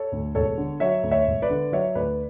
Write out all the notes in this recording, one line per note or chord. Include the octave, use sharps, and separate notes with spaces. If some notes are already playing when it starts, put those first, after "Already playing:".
Already playing: A4 C#5
D2
E1 A4 C#5
D3
F#3 C#5 E5
D2
C#5 E5
E1
B4 D5
D3
F#3 C#5 E5
D2 B4 D5